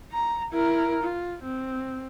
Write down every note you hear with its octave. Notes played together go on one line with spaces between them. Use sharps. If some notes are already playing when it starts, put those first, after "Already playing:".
A#5
E4 A#4
F4
C4